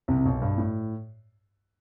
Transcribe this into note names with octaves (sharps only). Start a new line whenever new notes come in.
C2 C3
C3
B1 B2
G2
A2